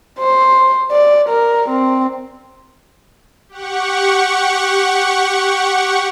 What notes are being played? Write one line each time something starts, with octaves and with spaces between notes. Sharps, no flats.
C5
D5
A#4
C4
G4 F#5 C#6